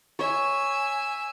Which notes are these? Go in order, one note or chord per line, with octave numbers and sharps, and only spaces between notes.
C#5 E5 G#5